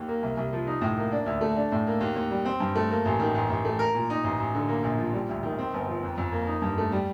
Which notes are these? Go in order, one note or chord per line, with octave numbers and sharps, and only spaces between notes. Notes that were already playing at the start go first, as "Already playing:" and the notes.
Already playing: D#2
A#3
C2
C2
F3
D#4
A2
A#3
D4
D2
A3
D4
A2
A#3
D#2
D#2
G3
C4
G2
A3
A#3
A1
D#3
A1
A1
A3
A#4
A#2
D#4
A1
A1
D3
A#3
A#1
F3
G3
D2
D#3
C4
G1
F3
F2
F2
A#3
D#4
G2
A3
G3